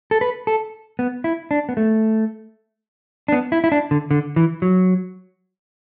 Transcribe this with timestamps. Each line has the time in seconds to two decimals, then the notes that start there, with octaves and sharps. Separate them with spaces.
0.11 A4
0.21 B4
0.47 A4
0.99 B3
1.24 E4
1.51 D4
1.69 B3
1.77 A3
3.28 D4
3.32 B3
3.52 E4
3.64 E4
3.72 D4
3.91 D3
4.11 D3
4.36 E3
4.62 F#3